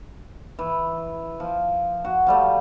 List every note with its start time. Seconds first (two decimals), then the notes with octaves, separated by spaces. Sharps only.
0.59 E3
1.40 F3
2.05 F#4
2.27 F3 G3 A3